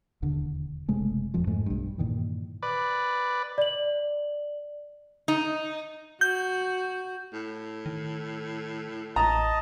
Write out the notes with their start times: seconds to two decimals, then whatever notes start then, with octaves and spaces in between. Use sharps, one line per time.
0.22 E1 D#2 D3
0.88 F#1 C3 G#3 A3
1.34 D#1 F2 F3
1.47 F2 G#2 G#3 A3
1.66 B1 G2
1.98 G2 A#2 D#3 E3
2.62 B4 D5
3.58 D5 F#7
5.28 D#4
6.21 F#4 G6
7.33 A2
7.86 D#3
9.16 A1 D#5 A5 A#5